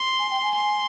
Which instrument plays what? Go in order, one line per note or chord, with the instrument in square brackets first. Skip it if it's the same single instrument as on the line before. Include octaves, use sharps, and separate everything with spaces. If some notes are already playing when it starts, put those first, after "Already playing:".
Already playing: [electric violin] C6
[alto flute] G#5
G5
G#5
[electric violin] C6